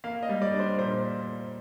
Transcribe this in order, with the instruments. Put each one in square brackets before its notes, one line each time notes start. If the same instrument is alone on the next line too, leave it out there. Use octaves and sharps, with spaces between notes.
[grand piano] A#3 F5
D#5
G3
D5
D4
C5
A#2 C5